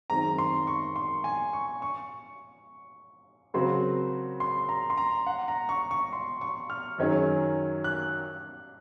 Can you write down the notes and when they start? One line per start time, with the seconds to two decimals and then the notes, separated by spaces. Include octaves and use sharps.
0.10 F#2 D#3 G#3 C4 A#5
0.38 C6
0.67 C#6
0.96 C6
1.24 G#5
1.53 C#6
1.82 C#6
3.54 C#3 F#3 C4 F#4 A#4 C6
4.40 C6
4.69 A#5
4.90 C6
4.97 A#5
5.27 F#5
5.48 A#5
5.69 C#6
5.91 C#6
6.13 C6
6.41 C#6
6.70 F6
6.98 F#2 D#3 F#3 C#4 G#4
7.84 F#6